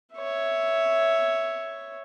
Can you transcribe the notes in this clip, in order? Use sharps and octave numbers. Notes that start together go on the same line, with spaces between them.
C#5 E5